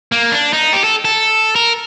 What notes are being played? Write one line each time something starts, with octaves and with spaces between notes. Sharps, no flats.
A#3
D4
D#4
G4
A4
A4
A#4